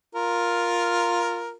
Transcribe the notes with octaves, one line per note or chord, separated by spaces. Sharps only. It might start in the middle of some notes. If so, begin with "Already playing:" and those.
F4 A#4